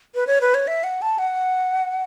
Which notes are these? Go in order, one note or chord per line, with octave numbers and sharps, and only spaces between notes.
B4
C#5
B4
C#5
E5
F#5
A5
F#5